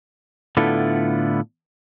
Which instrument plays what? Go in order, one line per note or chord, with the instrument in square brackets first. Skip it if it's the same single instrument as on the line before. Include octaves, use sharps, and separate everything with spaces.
[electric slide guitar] A2 D3 B3 E4 F4 A4